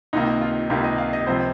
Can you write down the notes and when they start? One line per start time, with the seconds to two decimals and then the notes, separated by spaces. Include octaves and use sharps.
0.13 C#2 C3 D#3 A#3 D#4
0.41 F4
0.70 C#2 C3 D#3 A#3 G4
0.84 D#5
0.98 F5
1.13 D#5
1.26 C#2 C3 F3 C4 C5